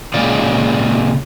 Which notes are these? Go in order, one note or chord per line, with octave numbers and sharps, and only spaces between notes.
A#2 C#3 G#3 F4 D5